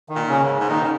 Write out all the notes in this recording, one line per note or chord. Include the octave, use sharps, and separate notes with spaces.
D#3
A#2
C#3 C#4
G#2
G#2
A#2 D#3 D#4
C#3